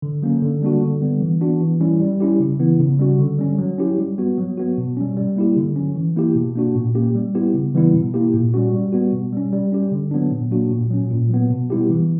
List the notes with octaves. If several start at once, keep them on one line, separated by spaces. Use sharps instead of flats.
D3
F#3 A#3 C#4
D3
G3 A#3 D4 F#4
D3
G3 B3
E3
B3 D4 F#4
E3
G3 C#4 E4
G3
C#4 E4 G4
C#3
E3 B3 E4
C#3
G3 C#4 F#4
D3
G3 C#4
F#3
C#4 E4 G4
G3
B3 F#4
F#3
B3 F#4
B2
G3 C#4
G3
A#3 E4 G4
D3
F#3 C#4
E3
A#3 E4 G4
B2
A#3 D4 F#4
A#2
A#3 C#4 G4
G3
B3 E4 G4
C#3
E3 G3 B3 E4
B2
A#3 E4 G4
A#2
G3 C#4 F#4
G3
B3 F#4
B2
G3 C#4
G3
C#4 G4
D3
F#3 B3 D4
A#2
F#3 A#3 D4 F#4
A#2
F#3 C#4
A#2
F#3 B3
B2
G3 B3 E4 G4
E3